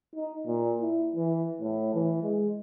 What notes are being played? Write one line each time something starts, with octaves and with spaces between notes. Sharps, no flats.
D#4
A#2
E4
E3
A2
E3
G#3